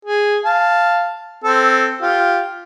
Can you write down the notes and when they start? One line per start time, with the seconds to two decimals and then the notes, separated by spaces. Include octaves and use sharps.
0.05 G#4
0.45 F5 A5
1.44 C4 A4
2.02 F4 G4